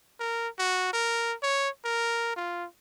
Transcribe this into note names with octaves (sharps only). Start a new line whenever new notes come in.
A#4
F#4
A#4
C#5
A#4
F4